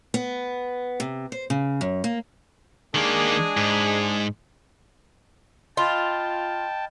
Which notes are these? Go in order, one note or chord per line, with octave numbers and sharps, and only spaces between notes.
B3
C3
C5
C#3
F#2
A#3
D#3 G#3 A#3 D4 G#4
G#2
F4 D#5 G5 A5 B5 F6